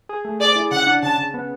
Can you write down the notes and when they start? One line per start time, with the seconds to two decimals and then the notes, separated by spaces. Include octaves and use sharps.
0.09 G#4
0.25 A3
0.40 G#4 D5
0.56 E4
0.71 C#3 F#5
0.87 D4
1.03 C#3 A5
1.18 C#3
1.34 B3